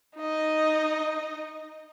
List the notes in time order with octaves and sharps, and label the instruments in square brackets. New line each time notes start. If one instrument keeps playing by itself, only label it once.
[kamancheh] D#4 D#5